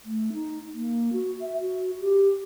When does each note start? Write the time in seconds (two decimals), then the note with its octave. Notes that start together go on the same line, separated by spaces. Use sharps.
0.05 A3
0.33 D#4
0.74 A#3
1.13 F#4
1.41 E5
1.61 F#4
2.00 G4